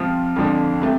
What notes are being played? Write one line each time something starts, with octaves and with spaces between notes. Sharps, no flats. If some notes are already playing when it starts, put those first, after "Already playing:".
Already playing: C3 F3 C4 F4
F2 D3 F3 D4
C3 A3